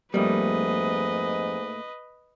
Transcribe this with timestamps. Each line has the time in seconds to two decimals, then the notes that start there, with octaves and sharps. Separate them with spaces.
0.14 F2 G#2 G3 A3 A#3 B4 D#5